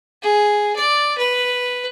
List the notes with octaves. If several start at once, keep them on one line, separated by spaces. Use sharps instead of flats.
G#4
D5
B4